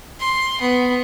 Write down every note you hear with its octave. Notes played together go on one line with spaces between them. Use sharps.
C6
B3